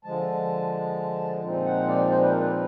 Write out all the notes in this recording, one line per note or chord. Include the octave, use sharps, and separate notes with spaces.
D3 F3 G#3 A5
A#2 F3 G#3 C4 D#4
F#5
D5
C5
B4
A#4
B4